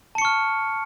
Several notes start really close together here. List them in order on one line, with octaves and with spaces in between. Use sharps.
A5 C#7 C#6 F6